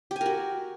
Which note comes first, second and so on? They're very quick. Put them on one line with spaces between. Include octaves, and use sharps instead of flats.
G4 G#5 A#4 F#4